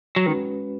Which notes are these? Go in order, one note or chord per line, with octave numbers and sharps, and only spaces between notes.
F#3
D#3 G#3 C#4 F#4 B4